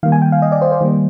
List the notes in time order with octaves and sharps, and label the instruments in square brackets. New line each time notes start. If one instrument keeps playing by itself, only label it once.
[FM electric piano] D#3 G3 A#3 F5
G#5
G5
F5
D#5
D5
C5
C5
D#3 G3 A#3